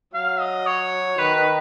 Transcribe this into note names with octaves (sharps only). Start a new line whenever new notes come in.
F#3 F5
D#5
C#5
D#3 B4
B4